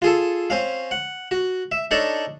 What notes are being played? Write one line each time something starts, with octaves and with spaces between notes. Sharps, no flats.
F4 G#4 A4
C4 C#4 F5
F#5
F#4
E5
D4 D#4 A4 C#5 D5